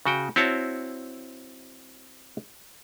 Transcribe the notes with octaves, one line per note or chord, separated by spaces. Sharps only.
C#3 F#4 G5
C4 E4 F#4 C#5 A5